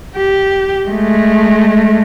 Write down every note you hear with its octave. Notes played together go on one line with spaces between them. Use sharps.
G4
G#3 A3